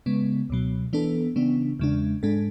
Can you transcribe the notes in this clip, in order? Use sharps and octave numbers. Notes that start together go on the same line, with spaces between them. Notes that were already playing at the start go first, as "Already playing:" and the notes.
C#3 G#3 B3
C#2 B2 F#3
E3 B3 D4 A4
C#3 E3 B3 D4
E2 C#3 G#3 D4
G#2 G#3 D4 A4